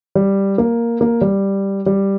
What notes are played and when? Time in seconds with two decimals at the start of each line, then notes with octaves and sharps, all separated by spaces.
0.15 G3
0.58 A#3
1.01 A#3
1.21 G3
1.86 G3